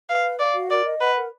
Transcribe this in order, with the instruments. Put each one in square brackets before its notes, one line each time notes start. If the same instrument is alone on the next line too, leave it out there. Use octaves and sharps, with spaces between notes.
[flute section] B4 [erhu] F5
[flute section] F5
[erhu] D5 [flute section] F5
[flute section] F#4
[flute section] A#4 [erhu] D5
[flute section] D#5
[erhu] B4 [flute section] F#5
[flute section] A#4